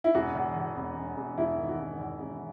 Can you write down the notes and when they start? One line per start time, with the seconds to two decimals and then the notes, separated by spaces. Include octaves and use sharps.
0.04 E4
0.15 E1 F#4
0.35 E2
0.56 E2
0.76 E1
0.97 E1
1.17 E1
1.38 E1 E4
1.58 D#3
1.68 F#4
1.79 E1
1.99 E2
2.19 E1